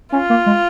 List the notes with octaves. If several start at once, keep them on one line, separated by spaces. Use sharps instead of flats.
C#4 F4
A#3
G#3